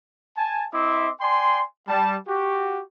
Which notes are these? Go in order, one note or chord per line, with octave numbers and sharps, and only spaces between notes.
G#5 A5
C4 E4 D#5 E5 C6 D6
D5 G5 G#5 C6
G3 A5
F#4 G4